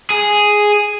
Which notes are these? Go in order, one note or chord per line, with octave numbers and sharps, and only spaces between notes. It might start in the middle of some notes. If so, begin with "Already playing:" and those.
G#4